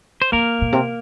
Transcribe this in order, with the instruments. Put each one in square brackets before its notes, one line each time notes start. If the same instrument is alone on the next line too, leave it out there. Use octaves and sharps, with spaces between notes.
[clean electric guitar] C5
[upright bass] F2 [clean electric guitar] A#3 A#4
[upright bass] A#2
C3